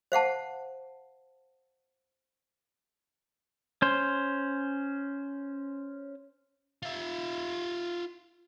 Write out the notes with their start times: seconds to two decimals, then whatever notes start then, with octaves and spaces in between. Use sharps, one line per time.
0.12 C5 F5 F#5 A5
3.82 C#4 C5
6.82 F4 E5